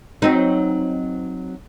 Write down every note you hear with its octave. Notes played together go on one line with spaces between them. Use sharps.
F#3 C4 D#4